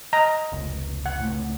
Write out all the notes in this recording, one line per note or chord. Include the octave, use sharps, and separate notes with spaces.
D#5 A#5
F1 C#2
F#5
C#2 A2